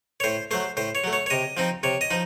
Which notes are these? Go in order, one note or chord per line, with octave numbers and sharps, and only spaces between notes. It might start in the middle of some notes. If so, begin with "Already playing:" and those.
C#5
A2 C5
F#3 A3 C5
A2 C5
C#5
F#3 A3
C#5
C#5
C3 D#5
F3 C4 D#4
C3 C#5
D#5
F3 D#4